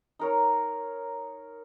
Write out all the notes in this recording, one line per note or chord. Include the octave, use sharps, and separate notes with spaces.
D#4 A#4 C#5